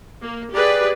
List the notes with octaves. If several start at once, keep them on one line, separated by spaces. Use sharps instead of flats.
A#3
G4 G#4 B4 D5